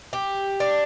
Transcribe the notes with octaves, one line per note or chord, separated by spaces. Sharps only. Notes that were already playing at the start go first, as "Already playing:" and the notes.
G4
D4